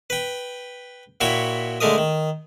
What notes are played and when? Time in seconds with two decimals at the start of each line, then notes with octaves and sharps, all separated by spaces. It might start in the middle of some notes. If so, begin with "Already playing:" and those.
0.10 B4 G5
1.21 A#2 E4 F#4 C#5 G5 B5
1.80 D3 G#3 A3 A#4 D#6
1.98 D#3